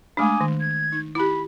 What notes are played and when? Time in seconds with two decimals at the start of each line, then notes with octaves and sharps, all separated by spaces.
0.17 G#3 A3 D4 G#5 D6 D#6
0.41 D#3
0.60 G#6
0.92 D#4
1.15 E4 G4 B5